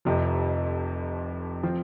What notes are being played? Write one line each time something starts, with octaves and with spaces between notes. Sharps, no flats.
F1 F2 C3 F3
F3 C4 F4